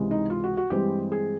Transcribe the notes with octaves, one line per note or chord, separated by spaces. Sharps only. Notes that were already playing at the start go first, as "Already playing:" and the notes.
Already playing: C#2 C3 E3 G#3
D#4
F4
F#4
F#4
G2 E3 G#3 C4 G4
G#4